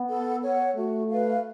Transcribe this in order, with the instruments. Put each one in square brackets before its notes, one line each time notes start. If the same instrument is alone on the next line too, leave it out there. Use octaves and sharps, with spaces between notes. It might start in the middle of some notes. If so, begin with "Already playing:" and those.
Already playing: [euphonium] B3
[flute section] A4
C#5 F#5
[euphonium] A3 [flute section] F#4
[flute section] B4 F5